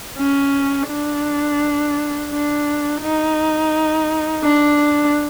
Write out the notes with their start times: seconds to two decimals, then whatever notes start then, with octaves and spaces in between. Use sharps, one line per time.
0.18 C#4
0.88 D4
2.31 D4
3.02 D#4
4.44 D4